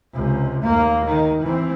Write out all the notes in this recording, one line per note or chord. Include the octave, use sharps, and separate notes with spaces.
C#2 C3
D#2 A#3
D#3
E3 C4